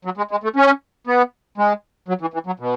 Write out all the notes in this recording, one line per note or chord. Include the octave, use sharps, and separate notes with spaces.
F#3
G#3
G#3
A3
C#4
B3
G#3
F#3
E3
E3
F#3
B2